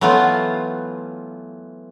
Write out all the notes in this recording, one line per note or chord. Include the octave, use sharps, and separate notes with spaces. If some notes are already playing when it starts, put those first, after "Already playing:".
E3 F#3 A3 B3 F4